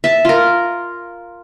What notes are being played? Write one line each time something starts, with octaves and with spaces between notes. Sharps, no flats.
E5 A5
F4 A#4